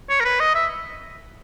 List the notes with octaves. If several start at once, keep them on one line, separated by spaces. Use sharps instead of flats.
C#5
A#4
B4
D#5
E5